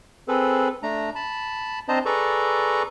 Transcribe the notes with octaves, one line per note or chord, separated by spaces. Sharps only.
C4 G#4 A4 B4
A3 D4 A#5
A5 B5
C4 D4 C5 D#5 A5 A#5
G#4 A4 B4 D5 A#5 C#6